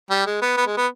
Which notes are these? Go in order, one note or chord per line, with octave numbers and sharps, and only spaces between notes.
G3
G#3
B3
B3
G#3
B3